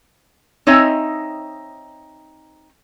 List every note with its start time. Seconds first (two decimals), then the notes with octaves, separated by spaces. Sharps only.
0.67 C4 D#4 C#5 D#5 E5 G#5